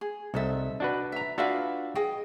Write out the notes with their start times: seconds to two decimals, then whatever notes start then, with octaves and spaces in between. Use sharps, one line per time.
0.01 G#4
0.34 C2 D#4 A4 E5
0.80 D4 F#4 B4
1.12 E5 A#5
1.38 D4 F4 F#4 B4 E5 F5
1.95 G#4 D#5 G5